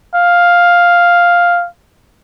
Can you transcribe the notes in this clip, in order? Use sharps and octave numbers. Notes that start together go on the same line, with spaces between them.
F5